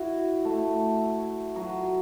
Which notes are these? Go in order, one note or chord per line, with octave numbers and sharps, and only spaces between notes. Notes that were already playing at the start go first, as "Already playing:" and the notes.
Already playing: E4 F#4
A3
F#3